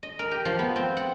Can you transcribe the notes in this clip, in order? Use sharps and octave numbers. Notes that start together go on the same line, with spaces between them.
D#5
A#4
G4
F3
B3
C4
F#5